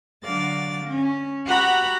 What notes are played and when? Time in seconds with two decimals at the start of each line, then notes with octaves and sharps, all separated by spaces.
0.23 D3 F#3 D5 F5 A6
0.85 C#4
1.46 F#4 G4 F#5 A#5 B5